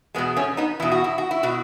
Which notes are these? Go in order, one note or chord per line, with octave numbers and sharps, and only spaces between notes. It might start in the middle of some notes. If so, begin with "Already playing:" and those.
E2 B2 G#3 B3
A3 C#4
B3 D#4
E2 B2 E4
F#4
E4
F#4
E4
B2 F#4